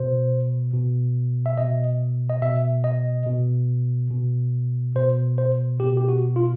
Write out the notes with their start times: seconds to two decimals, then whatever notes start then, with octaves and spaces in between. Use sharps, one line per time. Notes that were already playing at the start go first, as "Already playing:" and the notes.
Already playing: B2 C5
0.74 B2
1.46 E5
1.58 B2 D#5
2.30 D#5
2.42 B2 E5
2.84 D#5
3.26 B2
4.11 B2
4.95 B2 C5
5.38 C5
5.80 B2 G4
5.97 G4
6.08 F#4
6.36 F4